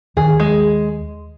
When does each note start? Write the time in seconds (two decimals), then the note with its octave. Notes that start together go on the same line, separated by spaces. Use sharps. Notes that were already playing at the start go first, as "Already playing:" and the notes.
0.16 D#2 D#3 G#4
0.40 G#3